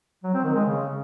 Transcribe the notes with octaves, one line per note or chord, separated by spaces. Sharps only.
F#3
C4
D#3
G#3
C#3